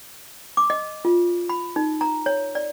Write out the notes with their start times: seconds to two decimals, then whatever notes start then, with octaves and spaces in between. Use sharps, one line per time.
0.57 D6
0.70 D#5
1.05 F4
1.49 B5
1.76 D#4
2.01 A#5
2.26 C#5
2.55 D5